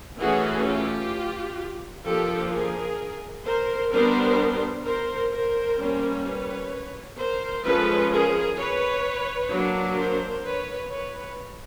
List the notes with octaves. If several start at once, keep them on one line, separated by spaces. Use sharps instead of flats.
E3 A3 C#4 F#4 G#4
F4 G4
F3 A#3 D4 G4 A4
G#4 A#4
A#4 C5
G3 B3 D4 A#4 C5
A#4 C5
A#4 C5
G3 A#3 C#4
B4 C#5
A#4 C5
F3 G#3 C#4 A4 B4
G#4 A#4
B4 C#5
F#3 A#3 D4
A#4 C5
B4 C#5
B4 C#5